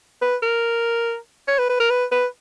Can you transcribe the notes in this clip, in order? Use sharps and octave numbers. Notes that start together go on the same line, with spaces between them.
B4
A#4
C#5
B4
B4
A#4
B4
B4